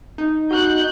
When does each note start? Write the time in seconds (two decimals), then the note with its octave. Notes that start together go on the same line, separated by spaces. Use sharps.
0.18 D#4
0.51 F#4 F#6 G6